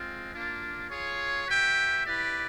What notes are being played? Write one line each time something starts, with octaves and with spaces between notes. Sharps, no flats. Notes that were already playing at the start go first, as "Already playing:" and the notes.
Already playing: G#3 C4 F4
A#3 D4 F4
F4 G#4 C#5
F#4 B4 E5 G5
E4 G4 B4 D5